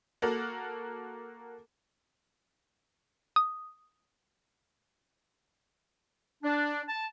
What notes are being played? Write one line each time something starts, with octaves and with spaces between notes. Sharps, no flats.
A#3 F#4 A4 A#4
D#6
D4
A5